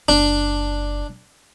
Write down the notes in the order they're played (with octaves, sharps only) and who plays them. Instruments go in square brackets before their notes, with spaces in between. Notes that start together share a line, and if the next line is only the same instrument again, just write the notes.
[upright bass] F#1 [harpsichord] D4